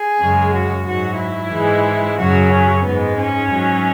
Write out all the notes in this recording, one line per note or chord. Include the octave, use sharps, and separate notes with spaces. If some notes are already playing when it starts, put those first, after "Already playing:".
Already playing: G#4
F#2 C#3 G#3
F#4
G#2 F#3 F#4
E4
G#2 E3 G#3
F#2 C#3 F#3 F#4
C#4
G#2 G#3 B3
C#4
G#2 F#3